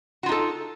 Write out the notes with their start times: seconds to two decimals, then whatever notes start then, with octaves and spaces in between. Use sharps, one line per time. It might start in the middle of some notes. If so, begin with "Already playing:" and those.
0.23 F#4
0.26 F4
0.29 D#4
0.32 A4